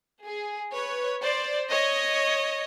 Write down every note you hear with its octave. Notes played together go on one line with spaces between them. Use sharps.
G#4
B4 C#5
C5 D5
C#5 D#5